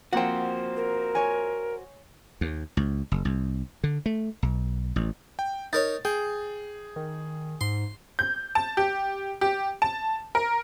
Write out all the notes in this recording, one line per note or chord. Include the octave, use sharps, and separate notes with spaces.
F3 A#3 C4 F#4 C5 F#5 G5
A#4
C#5 G#5
D#2
C#2
F#1
C2
D3
A3
B1
A1
G5
D#4 A#4 C#5 A6
G#4 G5
D#3
G#2 C6
G6
A5
G4
G4
A5
A#4